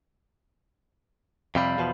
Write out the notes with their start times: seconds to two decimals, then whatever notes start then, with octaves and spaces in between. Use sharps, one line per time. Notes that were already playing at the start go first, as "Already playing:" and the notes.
1.55 F2 C3 G3 F5 B5
1.78 E2 B2 F3